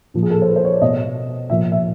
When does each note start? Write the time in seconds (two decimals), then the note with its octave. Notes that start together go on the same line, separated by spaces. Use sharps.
0.14 A#2 F3
0.23 G#4
0.30 A4
0.42 C5
0.48 B4
0.56 C5
0.65 C#5
0.73 D5
0.82 B2 D#5
1.49 A#2 F3 E5
1.72 E5